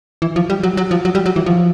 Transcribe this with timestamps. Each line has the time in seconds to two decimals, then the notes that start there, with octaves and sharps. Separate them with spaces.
0.22 E3
0.36 F3
0.50 G3
0.63 F#3
0.77 F#3
0.91 F3
1.05 F#3
1.15 G3
1.26 F#3
1.36 E3
1.46 F3